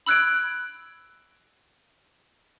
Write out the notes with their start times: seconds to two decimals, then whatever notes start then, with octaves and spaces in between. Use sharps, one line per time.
0.06 B5 E6 F#6 G#6 D7